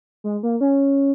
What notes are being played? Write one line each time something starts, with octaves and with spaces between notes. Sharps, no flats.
G#3
A#3
C#4